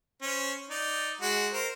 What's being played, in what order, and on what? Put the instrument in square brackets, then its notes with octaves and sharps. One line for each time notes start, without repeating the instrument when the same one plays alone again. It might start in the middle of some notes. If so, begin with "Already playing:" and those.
[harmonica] C#4 C5
D#4 D5
G#3 F#4
A#4 C5